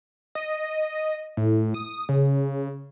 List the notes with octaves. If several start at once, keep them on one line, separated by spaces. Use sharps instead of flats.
D#5
A2
D#6
C#3